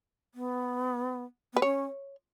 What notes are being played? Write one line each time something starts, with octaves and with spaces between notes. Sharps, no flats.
B3
B3 B4
C#4 C#5